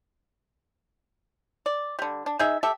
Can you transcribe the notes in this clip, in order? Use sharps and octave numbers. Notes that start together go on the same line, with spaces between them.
D5
D3 G3
D4
D#4 G#4 E5
G4 A4 E5